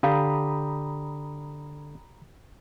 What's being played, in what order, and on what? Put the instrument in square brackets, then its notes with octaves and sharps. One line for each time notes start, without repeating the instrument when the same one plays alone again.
[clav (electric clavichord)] D3 [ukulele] G4 F5 [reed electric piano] A#5 B5 D#6